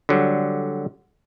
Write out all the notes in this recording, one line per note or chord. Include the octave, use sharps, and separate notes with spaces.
D3 F#3 G3